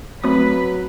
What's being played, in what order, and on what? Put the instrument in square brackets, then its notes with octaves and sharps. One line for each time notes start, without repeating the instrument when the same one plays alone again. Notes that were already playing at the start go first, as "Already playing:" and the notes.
[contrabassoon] F#3 [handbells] A3 C4 D#6 [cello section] B4